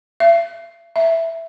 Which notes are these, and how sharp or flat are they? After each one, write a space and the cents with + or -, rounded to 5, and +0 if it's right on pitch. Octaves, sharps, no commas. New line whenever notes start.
E5 +40
E5 +0